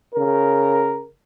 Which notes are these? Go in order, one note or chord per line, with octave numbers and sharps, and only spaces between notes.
C#3 A#4